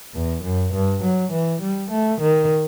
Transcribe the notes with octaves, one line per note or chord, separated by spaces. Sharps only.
E2
F#2
G2
F#3
E3
G3
A3
D#3